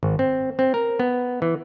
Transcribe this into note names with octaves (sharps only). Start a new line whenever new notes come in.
G#1
C4
C4
A#4
B3
E3